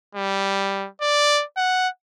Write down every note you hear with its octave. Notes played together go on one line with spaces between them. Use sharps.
G3
D5
F#5